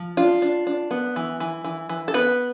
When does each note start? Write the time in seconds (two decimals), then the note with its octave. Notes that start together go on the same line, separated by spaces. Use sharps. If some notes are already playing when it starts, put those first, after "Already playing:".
Already playing: F3
0.17 D4 F4
0.42 D4
0.67 D4
0.91 B3
1.16 E3
1.40 E3
1.64 E3
1.89 E3
2.08 A4
2.14 B3 B4